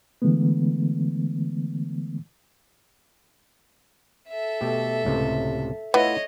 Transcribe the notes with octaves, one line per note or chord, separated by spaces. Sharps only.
D3 E3 G#3 A3 B3
A4 E5
B2 A3 G4
C#2 A2 C3
A3 B3 E4 F4 C#5 D#5